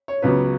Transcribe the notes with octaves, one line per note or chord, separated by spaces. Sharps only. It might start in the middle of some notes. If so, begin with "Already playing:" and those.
C#5
C#2 C#3 F#3 B3 B4